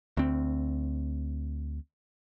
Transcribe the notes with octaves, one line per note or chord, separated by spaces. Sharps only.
D2 C4